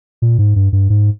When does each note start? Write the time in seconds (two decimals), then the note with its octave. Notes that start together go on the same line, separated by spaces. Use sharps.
0.22 A#2
0.39 G#2
0.56 G2
0.73 G2
0.90 G#2